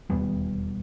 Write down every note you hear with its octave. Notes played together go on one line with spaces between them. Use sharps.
E1 D#2 G3 B3